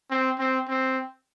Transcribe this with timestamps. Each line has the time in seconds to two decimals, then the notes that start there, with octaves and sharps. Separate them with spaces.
0.10 C4
0.39 C4
0.68 C4